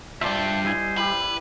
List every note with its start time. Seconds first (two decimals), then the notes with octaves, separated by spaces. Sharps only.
0.21 D2 G2 F4 C5 D5 E5 A5
0.65 G3 E4 D#5 G#5
0.97 E4 G4 B4